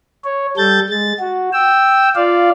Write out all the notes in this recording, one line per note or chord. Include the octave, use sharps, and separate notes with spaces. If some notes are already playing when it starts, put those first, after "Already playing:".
C#5
G3 A4 G6 A6
G#3 A6
F#4
G5 E6
F4 D5 F5